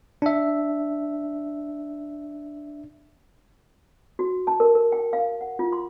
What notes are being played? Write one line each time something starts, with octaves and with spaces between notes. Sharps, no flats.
D4 E5
F#4
A5
A#4
A#4
G5
F5
F#5
F4
C6